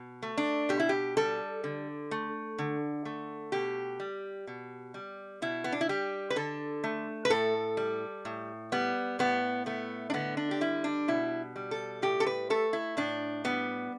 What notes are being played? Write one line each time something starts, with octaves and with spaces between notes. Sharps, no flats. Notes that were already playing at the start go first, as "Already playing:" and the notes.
Already playing: B2
A3
D4
B2 G4
E4
G4
G3 A4
D3
A3
D3
A3
B2 G4
G3
B2
G3
B2 E4
B3
D4
E4
G3 G4
B4
D3 A4
A3
B4
A2 A4
G3
A2
G3 B3
A2 B3
A3 B3
D4
D3 B3
D4
G4
G3 E4
D4
B2 E4
G3
A4
A2 G4
A4
B4
A3 A4
E4
A2 D4
G3 B3